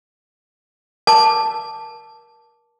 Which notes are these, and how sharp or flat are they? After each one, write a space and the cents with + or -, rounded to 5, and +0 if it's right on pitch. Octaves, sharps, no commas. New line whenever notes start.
A#4 +25 A5 +0 D6 +0